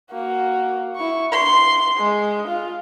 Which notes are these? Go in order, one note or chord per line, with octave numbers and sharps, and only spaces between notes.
A#3 F#4
E4 C#6
C6
G#3
F4